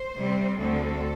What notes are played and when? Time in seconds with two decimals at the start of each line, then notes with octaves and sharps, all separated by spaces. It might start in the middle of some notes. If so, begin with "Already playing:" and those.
Already playing: C5
0.17 C3 G3 C4
0.59 D2 D3 C4 A4